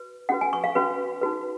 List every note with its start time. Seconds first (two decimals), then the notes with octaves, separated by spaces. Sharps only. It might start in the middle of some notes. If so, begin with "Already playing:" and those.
Already playing: F#4 B4
0.29 C#4 F#4 B4 F#5
0.41 G#5
0.53 C#6
0.64 F5
0.75 C#4 F#4 B4
1.21 D#4 F#4 B4